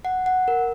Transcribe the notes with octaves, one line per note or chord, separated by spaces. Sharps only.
F#5
F#5
A#4